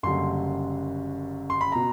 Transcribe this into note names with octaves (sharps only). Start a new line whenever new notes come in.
F#1 F#2 D3 G3 C6
C6
B5
B2 A#5